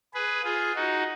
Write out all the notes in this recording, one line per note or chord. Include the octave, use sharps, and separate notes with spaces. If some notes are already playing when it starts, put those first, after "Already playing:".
G#4 B4
F4 G#4
D#4 F#4